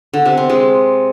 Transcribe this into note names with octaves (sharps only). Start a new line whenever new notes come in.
D3
C3
C4
G#3